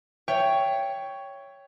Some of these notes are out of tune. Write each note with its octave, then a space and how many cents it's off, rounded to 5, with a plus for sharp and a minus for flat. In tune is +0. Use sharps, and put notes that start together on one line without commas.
C#5 +10 E5 +20 G5 +0